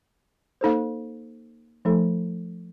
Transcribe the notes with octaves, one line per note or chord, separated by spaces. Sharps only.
A#3 D#4 A4 C5
F3 A3 D#4 A4